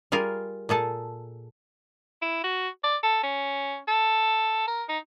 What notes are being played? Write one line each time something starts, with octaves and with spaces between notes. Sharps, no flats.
G3 F4 G#4 A#4
A#2 G#4 A4 A5
E4
F#4
D5
A4
C#4
A4
A#4
D#4